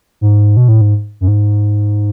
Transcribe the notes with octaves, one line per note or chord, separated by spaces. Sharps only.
G#2
B2
A2
G#2
F#2
G#2